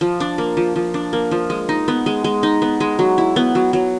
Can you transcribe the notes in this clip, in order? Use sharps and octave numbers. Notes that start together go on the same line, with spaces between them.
F3
D4
A#3
F3
F3
D4
A#3
F3
G#3
D#4
B3
G#3
G#3
D#4
B3
G#3
F#3
E4
B3
F#3
F#3